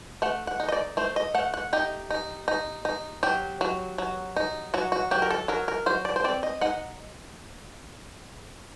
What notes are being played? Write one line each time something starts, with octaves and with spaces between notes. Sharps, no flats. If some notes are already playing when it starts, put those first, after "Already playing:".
A3 F#5
F#5
D#4
D#5
D5
A3 C5
D#5
A3 F#5
F#5
D#4 G4
D#4
D#4
D#4
F#3 G4
F#3
F#3
D#4
F#3 F#4
F#4
F#3 G4
A#4
A4
F#3 A#4
A#4
F#3 C5
D5
C5
C4 D5
D#5
D#4 F#5